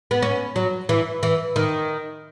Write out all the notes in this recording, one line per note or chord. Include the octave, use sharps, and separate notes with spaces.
B3
C#4
F#3
E3
E3
D#3